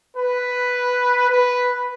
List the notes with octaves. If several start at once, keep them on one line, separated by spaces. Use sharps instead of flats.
B4
B4